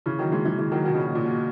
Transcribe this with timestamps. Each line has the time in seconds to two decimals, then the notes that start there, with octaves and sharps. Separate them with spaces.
0.06 C#3 E3
0.19 D#3 F#3
0.32 E3 G#3
0.45 E3 G#3
0.59 E3 G#3
0.72 D#3 F#3
0.85 B2 D#3
0.95 A#2 C#3
1.05 B2
1.15 A#2
1.25 B2